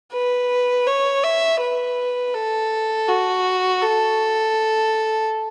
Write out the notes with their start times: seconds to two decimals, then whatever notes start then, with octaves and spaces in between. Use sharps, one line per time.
0.12 B4
0.87 C#5
1.24 E5
1.60 B4
2.34 A4
3.08 F#4
3.82 A4